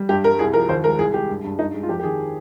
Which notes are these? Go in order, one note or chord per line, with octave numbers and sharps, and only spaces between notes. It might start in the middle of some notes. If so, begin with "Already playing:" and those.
Already playing: G3
G2 G4
G3 A#4
C2 G#4
F3 A#4
D#2 C5
G#3 A#4
C2 G#4
G#3 G4
G2
G2
G2 D#4
G#3
F4
F2 G4
G4
D#3 G#4